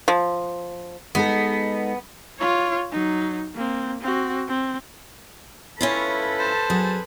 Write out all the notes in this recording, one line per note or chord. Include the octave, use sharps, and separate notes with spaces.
F3
G#3 B3 D#4 A4
F4 C#5
F#3 D#4
A#3 C4
C4 F#4
C4
C#4 E4 F4 A4 B4
C5 A5
F#3 C4 F#4 G#4